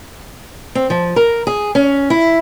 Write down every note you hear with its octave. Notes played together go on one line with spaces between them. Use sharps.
C4
F3
A#4
G#4
C#4
E4